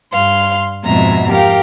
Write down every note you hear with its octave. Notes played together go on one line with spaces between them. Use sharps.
G2 F5 C6
F2 G#2 B2 G#3 E5 A#5
G4 A#4 F5 G5